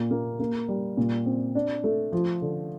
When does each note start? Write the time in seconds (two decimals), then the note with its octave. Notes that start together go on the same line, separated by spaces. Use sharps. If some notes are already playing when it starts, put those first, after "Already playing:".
Already playing: A#2
0.11 A#3
0.40 A#3
0.68 G3
0.97 A#2
1.26 C4
1.55 D4
1.84 A3
2.12 F3
2.42 D3